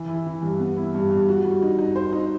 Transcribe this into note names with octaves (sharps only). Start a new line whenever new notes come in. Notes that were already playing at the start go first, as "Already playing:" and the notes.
Already playing: E3
E4
E3
G2
B3
E4
G2
G2
F#4
G3
D#4
D#4
C5
D#4